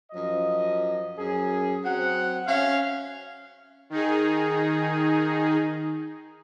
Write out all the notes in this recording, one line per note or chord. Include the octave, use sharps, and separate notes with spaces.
F#2 F3 D#5
F#2 G#4
F#3 C4 F#5
C#4 E5 F5
D#3 D#4 G#4